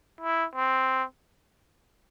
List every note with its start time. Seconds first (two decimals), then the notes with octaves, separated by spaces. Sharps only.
0.21 E4
0.55 C4